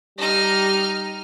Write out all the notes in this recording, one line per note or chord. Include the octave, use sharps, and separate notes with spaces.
G3 D#4 F6